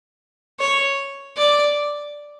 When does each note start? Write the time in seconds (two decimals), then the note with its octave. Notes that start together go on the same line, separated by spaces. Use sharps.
0.59 C#5
1.37 D5